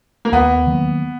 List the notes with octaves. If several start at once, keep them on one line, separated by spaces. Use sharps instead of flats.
A#3
D#2 B3
D#3 F#3 A#3